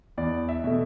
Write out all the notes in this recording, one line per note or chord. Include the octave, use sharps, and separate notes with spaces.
E2 D5
E5
B2 A3